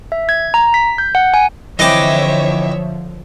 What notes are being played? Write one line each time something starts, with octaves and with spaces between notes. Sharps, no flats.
E5
G#6
A#5
B6
G6
F#5
G#5
D3 E3 F3 C4 C#5 D#5 E5 D6